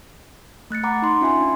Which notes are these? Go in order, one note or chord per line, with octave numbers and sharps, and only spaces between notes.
A3 F#6 A6 C#7
F#5 A#5 B5 D6
D#4 C6
C#4 F4 E5 G#5 C6
D4